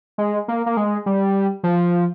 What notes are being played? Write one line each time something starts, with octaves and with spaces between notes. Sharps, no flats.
G#3
A#3
A#3
G#3
G3
F3